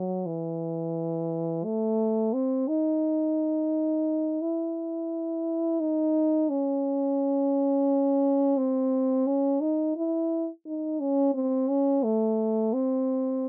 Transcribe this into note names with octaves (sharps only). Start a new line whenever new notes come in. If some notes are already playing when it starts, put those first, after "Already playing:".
Already playing: F#3
E3
A3
C4
D#4
E4
D#4
C#4
C4
C#4
D#4
E4
D#4
C#4
C4
C#4
A3
C4